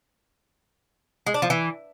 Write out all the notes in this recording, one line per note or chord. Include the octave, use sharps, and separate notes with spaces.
G#3
D4
F3
E3